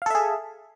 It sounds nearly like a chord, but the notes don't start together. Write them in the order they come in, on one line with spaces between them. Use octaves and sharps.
F5 A4 E5 G#4